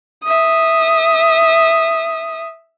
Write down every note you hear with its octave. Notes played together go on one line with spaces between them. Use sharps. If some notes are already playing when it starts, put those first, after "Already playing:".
E5 D#6